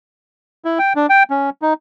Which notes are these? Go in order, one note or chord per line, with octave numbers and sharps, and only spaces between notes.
E4
G5
D4
G5
C#4
D#4